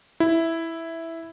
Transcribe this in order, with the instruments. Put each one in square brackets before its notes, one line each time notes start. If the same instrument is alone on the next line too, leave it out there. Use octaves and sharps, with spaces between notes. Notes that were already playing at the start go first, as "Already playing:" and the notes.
[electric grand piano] E4